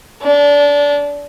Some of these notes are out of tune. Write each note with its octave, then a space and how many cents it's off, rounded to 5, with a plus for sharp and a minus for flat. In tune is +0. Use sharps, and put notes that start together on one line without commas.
D4 -25